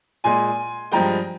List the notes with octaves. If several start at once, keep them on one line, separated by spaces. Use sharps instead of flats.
A#2 G#3 G#5 C6
G2 F3 G#3 G5 A#5